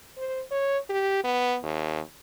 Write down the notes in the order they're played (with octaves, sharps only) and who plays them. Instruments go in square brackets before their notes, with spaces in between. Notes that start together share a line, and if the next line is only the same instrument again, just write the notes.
[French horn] C5
C#5
G4
B3
D#2